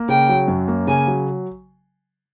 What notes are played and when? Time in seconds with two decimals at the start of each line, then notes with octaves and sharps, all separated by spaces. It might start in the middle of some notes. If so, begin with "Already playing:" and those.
Already playing: A#3
0.09 C#3 G5
0.29 F#3
0.48 F#2
0.68 A#3
0.87 C#3 G#5
1.07 F#3